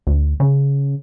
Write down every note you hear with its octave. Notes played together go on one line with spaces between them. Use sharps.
D2
C#3